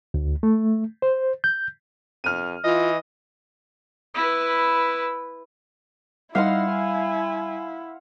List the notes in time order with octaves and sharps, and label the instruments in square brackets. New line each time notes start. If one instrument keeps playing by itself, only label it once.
[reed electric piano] D2
A3
C5
G6
[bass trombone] F2 [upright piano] F6 D#7
[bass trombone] E3 [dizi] F4 [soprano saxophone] D#5
[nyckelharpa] E4 B4
[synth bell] G3 F#6 C7 [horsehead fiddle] D#4 [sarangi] E4 [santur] F5 F#5 C6
[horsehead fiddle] G#5